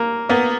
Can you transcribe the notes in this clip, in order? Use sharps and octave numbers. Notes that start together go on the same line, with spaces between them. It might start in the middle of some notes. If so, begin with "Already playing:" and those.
Already playing: A#3
A#3 B3